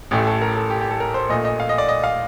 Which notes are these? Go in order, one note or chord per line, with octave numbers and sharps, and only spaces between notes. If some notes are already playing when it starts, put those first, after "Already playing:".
A1 A2 A3 G4
A4
A#4
A4
G4
G4
A4
A#4
C5
A#1 A#2 A3 D#5
D#5
F5
D#5
D5
D#5
F5